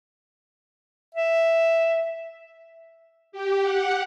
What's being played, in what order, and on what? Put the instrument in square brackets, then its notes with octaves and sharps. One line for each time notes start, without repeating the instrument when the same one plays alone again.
[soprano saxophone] E5
[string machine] G4
F#5